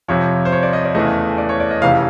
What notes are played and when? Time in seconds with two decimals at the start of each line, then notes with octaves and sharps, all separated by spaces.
0.08 F2 C3 F3 C#5
0.45 C5
0.52 C#5
0.63 D5
0.73 D#5
0.85 D5
0.95 E2 C#3 E3 A3 D#5
1.38 D5
1.49 C#5
1.60 D5
1.71 D#5
1.82 F1 F2 C#3 E3 F5